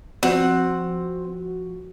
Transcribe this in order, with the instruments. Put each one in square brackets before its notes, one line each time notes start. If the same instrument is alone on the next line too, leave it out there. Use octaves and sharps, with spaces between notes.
[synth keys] F3 F#4 [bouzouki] C4 F#5